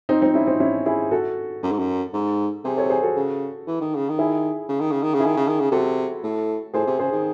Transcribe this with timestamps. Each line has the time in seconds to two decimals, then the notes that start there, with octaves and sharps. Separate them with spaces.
0.09 C4 D#4
0.22 C4 D#4
0.34 C#4 E4
0.47 C4 D#4
0.60 C#4 E4
0.86 E4 G#4
1.11 F#4 A4
1.63 F#2
1.71 G#2
1.79 F#2
2.13 G#2
2.64 C3 G#4 C5
2.77 A4 C#5
2.90 G#4 C5
3.03 F#4 A4
3.16 C#3
3.67 E3
3.81 D#3
3.95 C#3
4.09 D#3
4.19 E4 G#4
4.69 C#3
4.80 D#3
4.91 C#3
5.03 D#3
5.14 C#3
5.20 E4 G#4
5.26 D#3
5.37 C#3
5.48 D#3
5.60 C#3
5.72 C3 F#4 A4
6.23 A2
6.74 A2 G#4 C5
6.87 C3
6.99 C#3 G#4 C5
7.12 D#3